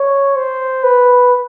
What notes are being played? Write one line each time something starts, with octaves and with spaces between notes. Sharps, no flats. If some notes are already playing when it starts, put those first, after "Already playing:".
Already playing: C#5
C5
B4